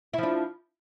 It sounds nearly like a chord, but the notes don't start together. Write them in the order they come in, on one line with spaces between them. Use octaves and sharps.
E4 F3 D4